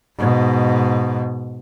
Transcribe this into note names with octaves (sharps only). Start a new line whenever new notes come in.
G#2 B2